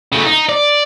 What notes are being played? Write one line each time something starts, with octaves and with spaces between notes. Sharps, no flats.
C#3 A3
D#4
D5